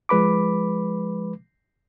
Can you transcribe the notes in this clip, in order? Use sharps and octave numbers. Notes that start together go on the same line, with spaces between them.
F3 G#3 B4 B5 D6